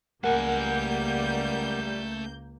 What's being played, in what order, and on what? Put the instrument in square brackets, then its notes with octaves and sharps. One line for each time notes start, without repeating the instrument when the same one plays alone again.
[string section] C#2 A#3 G6 [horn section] G3 [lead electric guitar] A3 G#5 [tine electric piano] A#4 F#5